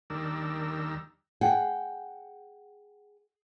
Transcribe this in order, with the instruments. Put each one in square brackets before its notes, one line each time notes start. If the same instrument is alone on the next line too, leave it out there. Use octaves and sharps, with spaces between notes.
[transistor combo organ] D#2 D#3 G3 D4 A#4 E6
[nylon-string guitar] G#4 F#5 G5